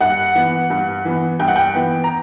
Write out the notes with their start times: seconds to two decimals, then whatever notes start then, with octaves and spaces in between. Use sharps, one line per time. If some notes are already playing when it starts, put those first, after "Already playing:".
0.01 G2 F#5
0.35 E3 B3
0.70 G2
1.05 E3 B3
1.39 G2 G5
1.48 F#5
1.56 G5
1.74 E3 B3
2.04 A#5